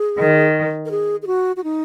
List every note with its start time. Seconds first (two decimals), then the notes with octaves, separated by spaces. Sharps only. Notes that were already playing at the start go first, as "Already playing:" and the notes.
Already playing: G#4
0.19 D#3
0.85 A#4
0.91 G#4
1.22 G#4
1.27 F#4
1.57 F#4
1.64 D#4